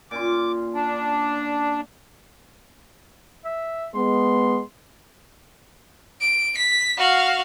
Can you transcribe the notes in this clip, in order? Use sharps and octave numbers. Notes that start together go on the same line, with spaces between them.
A#2 C#4 C6 D6
D4
E5
G#3 B3 C6
D7
B6
F#4 F5